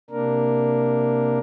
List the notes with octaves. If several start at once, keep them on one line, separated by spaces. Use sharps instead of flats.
C3 A#3 D4 A#4